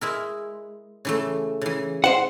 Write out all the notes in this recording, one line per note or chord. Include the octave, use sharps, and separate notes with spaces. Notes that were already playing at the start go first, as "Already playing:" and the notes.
G#3 E4 A#4
C#3 E3 A3
C#3 E3
C5 F#5